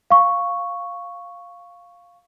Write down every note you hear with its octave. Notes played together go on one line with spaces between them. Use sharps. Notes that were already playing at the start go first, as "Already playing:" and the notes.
F5 C#6